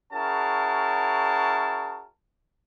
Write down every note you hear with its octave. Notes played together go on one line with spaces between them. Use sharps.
C#4 E4 F#4 G#4 A#4 A5